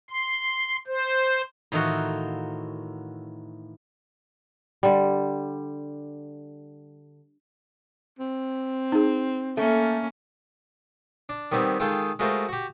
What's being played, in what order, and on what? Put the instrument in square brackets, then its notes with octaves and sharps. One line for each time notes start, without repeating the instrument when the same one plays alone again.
[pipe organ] C6
C5
[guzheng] A2 D#3 E3 D#4 F4 F#4
[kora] D3 G3
[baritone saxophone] C4
[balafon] D#4 G#4
[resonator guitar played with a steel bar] A3 [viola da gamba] A#3 C#4
[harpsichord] D4
D#3 G3 B3 C4
D#3 G#3 F4 A4 G5 D#6
G#3 A3 F4 F#4 A#4 C5
F#4 G4